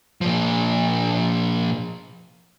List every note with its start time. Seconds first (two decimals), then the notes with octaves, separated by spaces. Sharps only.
0.21 A#2 F3